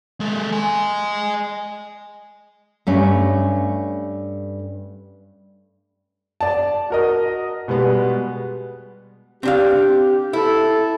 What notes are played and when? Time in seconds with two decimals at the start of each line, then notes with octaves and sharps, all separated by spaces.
0.20 G#3 A4
0.52 D#5 G#5
2.87 G2 A3 C#4
6.41 D5 A5
6.90 F#4 A#4 D#5
7.68 B2 G3 G#3 B3
9.43 C4 D4 G4 F5
10.33 E4 A4